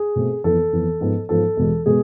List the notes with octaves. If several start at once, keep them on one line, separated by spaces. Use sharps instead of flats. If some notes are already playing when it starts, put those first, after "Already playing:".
Already playing: G#4
B2 A3 C4
F2 E3 B3 A4
F2 E3 B3
G#2 F3 B3
G#2 F3 B3 A4
E2 B2 G#3 B3
B2 G#3 B3 G#4